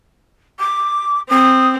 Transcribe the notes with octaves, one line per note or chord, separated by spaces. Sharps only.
D6
C4 D#6